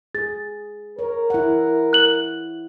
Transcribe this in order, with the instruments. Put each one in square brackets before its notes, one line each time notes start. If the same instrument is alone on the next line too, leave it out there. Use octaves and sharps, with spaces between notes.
[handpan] G#4 [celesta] A6
[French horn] A#4 [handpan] C#5
[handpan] E4 F#5
[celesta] F#6 F#7